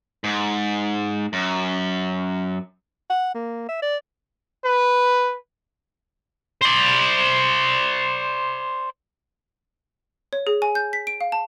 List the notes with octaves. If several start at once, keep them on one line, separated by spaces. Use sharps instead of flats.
G#2
F#2
F#5
A#3
E5
D5
B4
C5 D5
C#5
G#4
G#5
G6
B6
D7
F5
A5